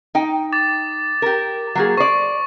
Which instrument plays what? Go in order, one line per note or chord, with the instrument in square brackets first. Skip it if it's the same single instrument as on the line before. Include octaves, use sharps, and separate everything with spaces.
[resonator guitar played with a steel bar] D#4 G5
[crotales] D6 A6
[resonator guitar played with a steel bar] G4 A#4
F#3 A#3 G#4
[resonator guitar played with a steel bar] C5 D5 [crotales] C#6